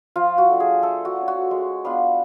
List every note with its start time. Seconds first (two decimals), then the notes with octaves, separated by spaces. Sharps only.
0.16 F3 F4
0.38 F#4
0.50 A3 D4 F4
0.60 G#4
0.83 A3 A4
1.05 F#4
1.16 F4
1.21 C#4
1.28 F#4
1.51 G#3
1.85 B3 D4 F4